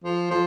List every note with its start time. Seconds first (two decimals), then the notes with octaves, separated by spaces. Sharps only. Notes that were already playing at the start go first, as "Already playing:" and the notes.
0.04 F3
0.31 F3